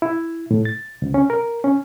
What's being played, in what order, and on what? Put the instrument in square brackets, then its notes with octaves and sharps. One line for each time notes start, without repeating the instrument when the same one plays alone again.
[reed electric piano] E4
A2
A6
C#2
C#4
A#4
C#4